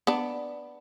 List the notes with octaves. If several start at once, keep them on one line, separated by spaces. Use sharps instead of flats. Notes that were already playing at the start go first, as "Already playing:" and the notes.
B3 D4